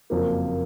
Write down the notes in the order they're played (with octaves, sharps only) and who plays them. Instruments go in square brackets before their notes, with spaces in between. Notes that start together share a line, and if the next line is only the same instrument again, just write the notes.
[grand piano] F#1 F2 F3 A#3